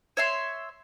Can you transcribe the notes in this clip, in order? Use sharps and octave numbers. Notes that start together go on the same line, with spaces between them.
C#5 E5 C6